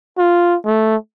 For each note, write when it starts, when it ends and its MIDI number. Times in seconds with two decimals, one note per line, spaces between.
0.18 0.57 65
0.65 0.96 57